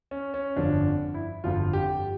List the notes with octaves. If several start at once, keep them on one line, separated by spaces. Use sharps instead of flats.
C#4
C#4
G1 F2 D3 F3 D4
E4
G1 F2 D3 F3 F4
G4